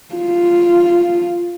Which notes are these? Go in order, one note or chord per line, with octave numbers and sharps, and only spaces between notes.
F4